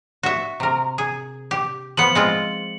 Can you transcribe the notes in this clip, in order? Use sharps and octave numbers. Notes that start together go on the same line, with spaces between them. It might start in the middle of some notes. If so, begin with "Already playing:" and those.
F#4 E5
C3 A#4
G#4
G4
F3 B3 C#7 F#7
G#3 C4 F4